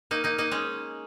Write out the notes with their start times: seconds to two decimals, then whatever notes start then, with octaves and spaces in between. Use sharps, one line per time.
0.11 A#3 D#4
0.24 A#3 D#4
0.38 A#3 D#4
0.51 G#3 C#4